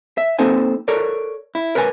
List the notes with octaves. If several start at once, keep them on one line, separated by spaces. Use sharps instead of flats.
E5
A#3 C4 D#4 A4 C5 G#5
A4 A#4 C#5 D5
E4
A#4 B4 C#5 F#5 G#5